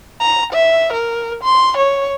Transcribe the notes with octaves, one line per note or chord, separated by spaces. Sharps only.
A#5
E5
A#4
C6
C#5